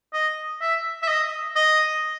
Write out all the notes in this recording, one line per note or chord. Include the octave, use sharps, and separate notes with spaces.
D#5
E5
E5
D#5
D#5